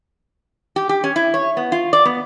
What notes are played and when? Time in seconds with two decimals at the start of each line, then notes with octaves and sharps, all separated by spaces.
0.76 G4
0.89 G4
1.04 C#4
1.16 E4
1.34 C#5
1.57 B3
1.72 F4
1.93 D5
2.05 B3